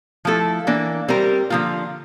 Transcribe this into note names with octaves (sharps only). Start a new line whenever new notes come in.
F3 A3 E4 A4
E3 A#3 D4
G3 C4 G4 A#4
D3 F3 A#3 F4